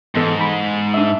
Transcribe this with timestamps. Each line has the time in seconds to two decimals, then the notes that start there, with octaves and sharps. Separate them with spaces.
0.16 G#2 E3 B3 A4
0.41 B5
0.94 D4 E5